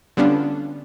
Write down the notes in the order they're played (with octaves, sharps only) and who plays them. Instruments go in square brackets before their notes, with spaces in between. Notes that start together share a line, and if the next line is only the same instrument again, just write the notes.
[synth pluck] D3 G3 B3 C#4 D4 F4